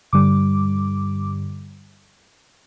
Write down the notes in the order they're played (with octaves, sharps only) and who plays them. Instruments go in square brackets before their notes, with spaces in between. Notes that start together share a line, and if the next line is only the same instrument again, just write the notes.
[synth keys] G2 D3 G3 D6